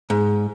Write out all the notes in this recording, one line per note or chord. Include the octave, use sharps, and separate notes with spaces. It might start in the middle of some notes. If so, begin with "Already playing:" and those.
G#2